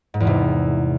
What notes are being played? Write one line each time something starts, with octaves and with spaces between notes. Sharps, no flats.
G#2
E2
C3